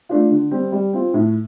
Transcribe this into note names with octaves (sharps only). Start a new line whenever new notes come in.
A3 D4 F4
D3
G3 C4
G3
C4 F4
A2